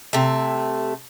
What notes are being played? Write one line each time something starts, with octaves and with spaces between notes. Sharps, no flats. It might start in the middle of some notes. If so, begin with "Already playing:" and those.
C3 A3